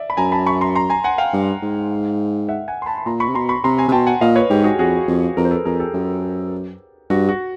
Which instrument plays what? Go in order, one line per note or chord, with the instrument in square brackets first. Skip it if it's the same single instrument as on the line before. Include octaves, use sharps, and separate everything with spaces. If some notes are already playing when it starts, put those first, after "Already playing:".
Already playing: [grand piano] D5 E5
B5
[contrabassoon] F#2 [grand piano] G#5 A#5
[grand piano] A5 B5
B5 C#6
A#5 C6
A#5 C6
G#5 A#5
F#5 G#5
F5 G5
[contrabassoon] G2
G#2
[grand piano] E5 F#5
F#5 G#5
C6
A5 B5
B5
[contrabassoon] A#2 [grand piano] A#5 C6
[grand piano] B5 C#6
[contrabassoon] C3
[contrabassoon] B2 [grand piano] A#5 C6
[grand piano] B5 C#6
[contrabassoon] C3 [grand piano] A#5 C6
[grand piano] G#5 A#5
[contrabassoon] C3
[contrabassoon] B2 [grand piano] G5 A5
[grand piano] F#5 G#5
[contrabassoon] A#2 [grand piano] D#5 F5
[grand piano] B4 C#5
[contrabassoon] G#2 [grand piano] G4
[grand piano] F#4 G#4
[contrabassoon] F2 [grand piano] F#4 G#4
[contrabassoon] F2
[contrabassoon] F2 [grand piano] G#4 A#4
[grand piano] C5
A4 B4
[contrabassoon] F2 [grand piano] G#4 A#4
[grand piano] G4 A4
[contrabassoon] F#2 [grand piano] G4
[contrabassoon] G2 [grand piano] F#4
[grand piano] F#4